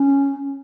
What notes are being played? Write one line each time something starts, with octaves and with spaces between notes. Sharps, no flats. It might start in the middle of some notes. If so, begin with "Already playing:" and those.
Already playing: C#4